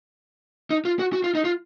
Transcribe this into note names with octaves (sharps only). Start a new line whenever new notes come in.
D#4
F4
F#4
F#4
F4
D#4
F4